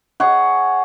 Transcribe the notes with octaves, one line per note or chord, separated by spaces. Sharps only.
G#4 C#5 F#5